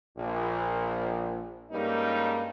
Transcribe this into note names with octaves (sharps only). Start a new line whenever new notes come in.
A#1
G2 G3 G#3 A#3 C#4 D#4